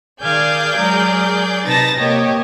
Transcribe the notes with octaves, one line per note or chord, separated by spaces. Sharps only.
D#3 G#4 D5 F5 G#5 G6
F#3 G#3 A#4
C3 D#4 B4 A5 A6 A#6
C3 A#3 G4 C#5 D#5